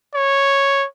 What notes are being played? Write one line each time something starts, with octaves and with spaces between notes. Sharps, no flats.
C#5